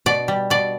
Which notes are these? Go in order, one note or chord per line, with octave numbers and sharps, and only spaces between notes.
B2 D5
G3
B2 D5